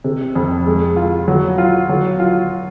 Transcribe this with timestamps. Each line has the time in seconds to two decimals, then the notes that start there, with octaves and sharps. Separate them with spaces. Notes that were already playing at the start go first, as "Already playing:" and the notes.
0.04 C3
0.35 F2
0.67 G#3
0.96 F4
1.28 F#3
1.58 F4
1.89 F#3
2.20 F4